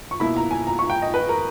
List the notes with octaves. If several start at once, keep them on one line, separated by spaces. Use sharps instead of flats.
C#6
B2 A#3 E4 B5
A#5
G#5
A#5
C#6
G5
D#5
B4
A#4